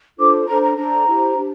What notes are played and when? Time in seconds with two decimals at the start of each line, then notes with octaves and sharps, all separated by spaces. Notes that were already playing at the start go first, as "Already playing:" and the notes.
0.18 D4 F4 A4 C5 D6
0.48 D4 A4 C5 A#5
0.63 A#5
0.77 D4 A4 C5 A#5
1.07 E4 G4 C5
1.36 D4 G4